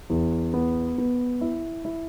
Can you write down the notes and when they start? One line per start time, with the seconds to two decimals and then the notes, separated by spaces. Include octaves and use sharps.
0.10 E2
0.54 B3
0.98 B3
1.41 E4
1.85 E4